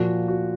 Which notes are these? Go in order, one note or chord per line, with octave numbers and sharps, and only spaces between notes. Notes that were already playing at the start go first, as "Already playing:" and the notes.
Already playing: A#2 F3 A#3 F#4
F#4